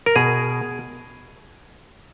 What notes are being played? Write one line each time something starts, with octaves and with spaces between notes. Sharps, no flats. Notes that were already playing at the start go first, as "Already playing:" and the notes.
A#4
B2 G#4